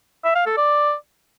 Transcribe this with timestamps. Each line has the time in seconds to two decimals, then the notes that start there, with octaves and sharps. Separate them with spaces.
0.24 E5
0.35 F5
0.46 A4
0.57 D5